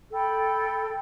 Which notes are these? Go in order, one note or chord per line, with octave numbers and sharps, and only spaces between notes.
A4 G5 B5